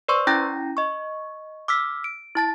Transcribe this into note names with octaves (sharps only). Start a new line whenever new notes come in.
B4 C5 D5 C6 C#6 E6
C#4 E4 G5 A#5 G6 A#6
D#5 C#6
D6 E6 F6 B6
D7
E4 A5 A6